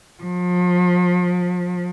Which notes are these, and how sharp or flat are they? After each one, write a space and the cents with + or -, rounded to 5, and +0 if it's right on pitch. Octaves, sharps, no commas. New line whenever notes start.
F3 +35